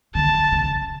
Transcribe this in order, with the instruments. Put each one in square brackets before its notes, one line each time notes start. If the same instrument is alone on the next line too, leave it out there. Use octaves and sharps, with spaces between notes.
[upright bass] D3 [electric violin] A5
[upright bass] C#3